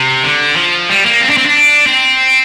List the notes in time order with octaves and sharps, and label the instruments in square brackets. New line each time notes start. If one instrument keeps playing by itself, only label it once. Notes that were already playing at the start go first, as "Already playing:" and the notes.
Already playing: [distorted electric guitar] C3
D3
F3
G3
A#3
C4
D4
C4
D4
C4